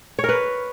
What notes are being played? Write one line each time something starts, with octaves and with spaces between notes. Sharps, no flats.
C#5
A#4
B4